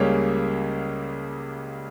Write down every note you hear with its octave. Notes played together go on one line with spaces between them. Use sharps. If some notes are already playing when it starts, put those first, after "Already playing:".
Already playing: C#2 C#3 G3 A#3 C#5